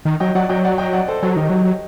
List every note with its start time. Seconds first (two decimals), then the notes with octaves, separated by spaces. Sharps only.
0.05 D#3
0.20 F#3 D#5 G5
0.35 F#3 D5 F#5
0.49 F#3 D#5 G5
0.64 D5 F#5
0.78 D#5 G5
0.93 D5 F#5
1.07 A4 C5
1.23 F#3 A4 C5
1.36 D#3 D#4 G4
1.50 F#3